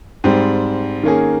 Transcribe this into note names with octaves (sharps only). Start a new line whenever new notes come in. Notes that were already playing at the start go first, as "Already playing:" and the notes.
G#2 G3 C4
D#3 A#3 C#4 G#4